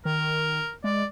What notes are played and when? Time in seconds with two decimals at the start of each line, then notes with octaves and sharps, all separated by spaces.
0.05 D#3 A#4
0.84 G#3 D5